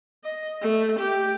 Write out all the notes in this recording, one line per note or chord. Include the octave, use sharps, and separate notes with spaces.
D#5
A3
G4